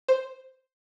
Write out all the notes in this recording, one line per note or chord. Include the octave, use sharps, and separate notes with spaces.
C5